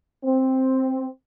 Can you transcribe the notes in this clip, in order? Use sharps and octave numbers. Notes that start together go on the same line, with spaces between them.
C4